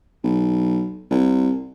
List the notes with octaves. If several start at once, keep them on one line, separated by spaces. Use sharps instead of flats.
B1
C2